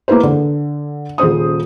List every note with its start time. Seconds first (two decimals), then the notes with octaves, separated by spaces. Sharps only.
0.08 A#3 E4 B4 C5
0.23 D3
1.18 D#1 C#3 C5 D#6